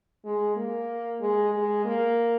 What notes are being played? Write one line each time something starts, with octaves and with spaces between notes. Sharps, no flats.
G#3
A#3
G#3
G#3
A#3